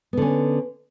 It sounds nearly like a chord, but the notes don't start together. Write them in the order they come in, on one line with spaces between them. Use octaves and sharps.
B3 D3 C#4